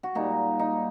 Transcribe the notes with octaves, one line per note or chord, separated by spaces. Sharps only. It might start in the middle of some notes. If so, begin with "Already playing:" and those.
F#4
A#2 G3 D#4
D#4